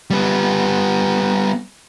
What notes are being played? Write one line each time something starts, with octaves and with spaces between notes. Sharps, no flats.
G3 B3